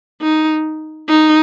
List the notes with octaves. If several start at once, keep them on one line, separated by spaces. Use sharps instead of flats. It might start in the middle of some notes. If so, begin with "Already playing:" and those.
D#4
D#4